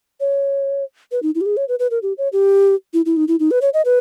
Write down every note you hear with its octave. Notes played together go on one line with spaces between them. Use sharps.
C#5
B4
D#4
E4
G4
G#4
C#5
B4
B4
A#4
G4
C#5
G4
E4
E4
D#4
E4
D#4
B4
C#5
D#5
B4